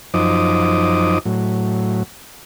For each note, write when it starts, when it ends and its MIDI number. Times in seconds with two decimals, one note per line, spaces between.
0.14 1.19 42
0.14 1.19 53
0.14 1.19 63
0.14 1.19 72
0.14 1.19 86
0.14 1.19 87
1.26 2.03 45
1.26 2.03 54